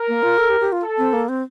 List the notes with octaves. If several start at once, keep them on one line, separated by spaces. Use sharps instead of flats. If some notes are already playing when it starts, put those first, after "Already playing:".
Already playing: A#4
A#3
F4
A4
G4
G4
F4
A4
C4
A#3
C4